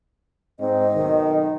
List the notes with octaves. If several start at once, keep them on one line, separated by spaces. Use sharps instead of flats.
G#2 C4 D#5
B1 D#3